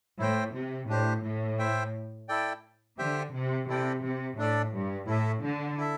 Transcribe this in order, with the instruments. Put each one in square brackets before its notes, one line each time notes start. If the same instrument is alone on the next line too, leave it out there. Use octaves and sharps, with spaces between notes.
[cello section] A2 [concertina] E4 C5 G5
[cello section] C3
[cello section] A2 [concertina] D4 G4 C5
[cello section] A2
[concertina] E4 C5 E5 G5
E4 A4 D5 G5
[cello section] D3 [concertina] G4 C5 E5 G5
[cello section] C3
[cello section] C3 [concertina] E4 A4 D5 G5
[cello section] C3
[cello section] A2 [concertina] D4 A4 D5
[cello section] G2
[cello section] A2 [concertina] E4 A4 E5
[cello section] D3
[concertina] E4 A4 E5